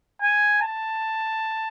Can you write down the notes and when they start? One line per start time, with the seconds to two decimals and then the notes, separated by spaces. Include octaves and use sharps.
0.22 G#5
0.62 A5